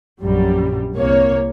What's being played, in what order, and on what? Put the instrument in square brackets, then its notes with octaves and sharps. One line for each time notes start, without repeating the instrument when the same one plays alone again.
[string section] A#1 F#2 G3
C2 A#3 C#5